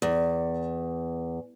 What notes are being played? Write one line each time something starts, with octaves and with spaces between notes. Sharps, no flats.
E2